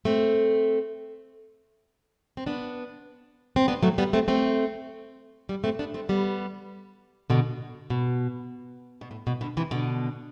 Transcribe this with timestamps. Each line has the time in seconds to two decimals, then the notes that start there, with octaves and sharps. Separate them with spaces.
0.05 A3 C4
2.37 C4
2.46 B3 D4
3.56 C4
3.68 B3 D4
3.83 F#3 A3
3.98 G3 B3
4.13 A3 C4
4.28 A3 C4
5.49 G3 B3
5.64 A3 C4
5.79 B3 D4
5.94 A3 C4
6.09 G3 B3
7.30 B2 D3
7.90 B2
9.01 B2
9.11 A2
9.27 B2
9.41 B2 D3
9.57 C3 E3
9.71 B2 D3